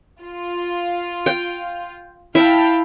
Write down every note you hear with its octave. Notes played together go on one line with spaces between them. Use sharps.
F4
G5
E4 F5 G5 A5